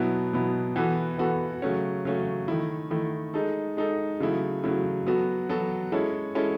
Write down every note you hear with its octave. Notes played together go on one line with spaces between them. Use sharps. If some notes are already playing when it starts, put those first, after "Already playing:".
Already playing: B2 F#3 B3 E4
B2 F#3 B3 E4
E3 B3 F#4 A4
E3 B3 F#4 A4
C#3 F#3 A3 C#4
C#3 F#3 A3 C#4
D#3 A3 E4
D#3 A3 E4
G#3 D#4 A4
G#3 D#4 A4
C#3 F#3 A3 E4
C#3 F#3 A3 E4
F#3 B3 F#4 A4
F#3 B3 F#4 A4
G#3 C#4 E4 A4
G#3 C#4 E4 A4